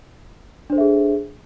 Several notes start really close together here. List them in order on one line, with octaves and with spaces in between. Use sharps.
D4 C5 A4 E5 G#4